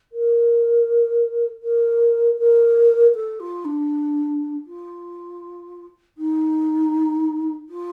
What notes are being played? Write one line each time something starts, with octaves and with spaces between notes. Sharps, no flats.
A#4
A#4
A#4
A4
F4
D4
F4
D#4
F4